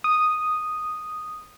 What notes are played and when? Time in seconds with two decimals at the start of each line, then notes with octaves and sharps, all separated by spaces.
0.04 D#6